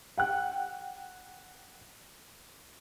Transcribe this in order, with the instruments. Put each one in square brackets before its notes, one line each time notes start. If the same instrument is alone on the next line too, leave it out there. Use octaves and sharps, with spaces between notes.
[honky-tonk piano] F#5 G5 F#6